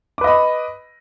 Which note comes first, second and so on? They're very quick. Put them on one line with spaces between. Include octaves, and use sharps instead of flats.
D6 B4 D#5 B5